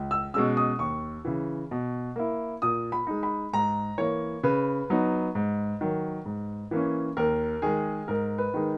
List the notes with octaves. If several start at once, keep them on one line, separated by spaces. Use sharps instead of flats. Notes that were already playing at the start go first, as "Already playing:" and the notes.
Already playing: C#2
E6
B2 G#3 C#4 E6
D#6
D#2 C#6
C#3 E3
B2
A#3 E4
A#2 D#6
B5
G#3 D#4
B5
G#2 A#5
E3 A#3 C#5
C#3 B4
F#3 B3 D#4
G#2
D#3 F#3
G#2
E3 A#3 C#4
D#2 A#4
D#3 G#3 G#4
G#2 A#4
B4
D#3 G#3 D#4